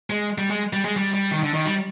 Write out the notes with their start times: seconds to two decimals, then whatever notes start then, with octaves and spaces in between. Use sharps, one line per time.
0.10 G#3
0.38 G3
0.50 G#3
0.73 G3
0.85 G#3
0.96 G3
1.14 G3
1.31 D#3
1.43 D3
1.54 D#3
1.65 G3